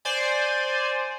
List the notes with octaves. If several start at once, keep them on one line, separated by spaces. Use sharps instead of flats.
C5 D5 G#5